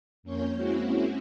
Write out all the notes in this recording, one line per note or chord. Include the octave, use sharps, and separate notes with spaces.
F2 A#3 C#4 C#5 G6
G#3 A#3 C4 C#4 E4 F#4